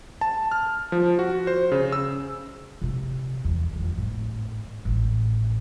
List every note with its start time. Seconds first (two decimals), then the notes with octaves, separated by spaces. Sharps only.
0.21 A5
0.51 F6
0.92 F3
1.19 F#4
1.47 C5
1.72 C#3
1.92 E6
2.82 C3 B3
3.45 E2
3.76 F2 F3
3.97 G#1 A2
4.85 A1